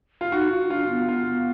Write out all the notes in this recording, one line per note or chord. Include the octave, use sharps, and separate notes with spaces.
F4
D#4 F#4
F4
D4 F4
B3
F4